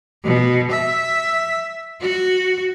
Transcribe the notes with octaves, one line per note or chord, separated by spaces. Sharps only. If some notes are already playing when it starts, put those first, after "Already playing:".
B2
E5
F#4